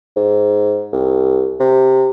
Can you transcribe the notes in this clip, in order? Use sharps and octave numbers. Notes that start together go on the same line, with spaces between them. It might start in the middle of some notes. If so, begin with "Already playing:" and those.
G#2
C2
C3